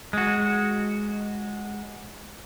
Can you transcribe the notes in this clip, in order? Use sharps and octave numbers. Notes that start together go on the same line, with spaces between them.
G#3 F#4